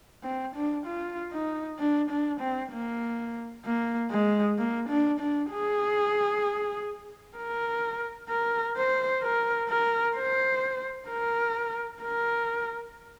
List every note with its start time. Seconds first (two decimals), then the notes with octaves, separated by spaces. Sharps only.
0.24 C4
0.55 D4
0.86 F4
1.32 D#4
1.79 D4
2.10 D4
2.41 C4
2.72 A#3
3.65 A#3
4.11 G#3
4.58 A#3
4.89 D4
5.20 D4
5.51 G#4
7.37 A#4
8.29 A#4
8.77 C5
9.23 A#4
9.69 A#4
10.16 C5
11.09 A#4
12.02 A#4